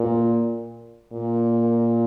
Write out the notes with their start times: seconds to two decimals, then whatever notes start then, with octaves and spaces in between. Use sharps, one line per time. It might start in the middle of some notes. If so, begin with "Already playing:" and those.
Already playing: A#2
1.12 A#2